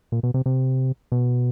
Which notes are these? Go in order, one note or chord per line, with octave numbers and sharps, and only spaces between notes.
A#2
B2
C3
C3
B2